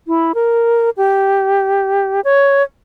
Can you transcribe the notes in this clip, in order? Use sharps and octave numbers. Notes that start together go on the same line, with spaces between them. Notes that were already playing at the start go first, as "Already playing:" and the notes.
E4
A#4
G4
C#5